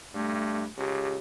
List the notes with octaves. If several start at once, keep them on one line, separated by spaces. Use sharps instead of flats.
G2 A3
C#2 G4